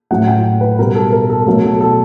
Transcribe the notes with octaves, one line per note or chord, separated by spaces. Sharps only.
A2 F#3 A3 F#5
G5
B4
B2 G3 A#4
A4
A#4
A4
B2 F#3 A3 A4
A4
A4